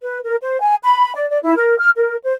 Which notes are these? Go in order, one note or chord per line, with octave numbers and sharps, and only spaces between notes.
B4
A#4
C5
G#5
B5
D5
D5
E4
A#4
F6
A#4
C5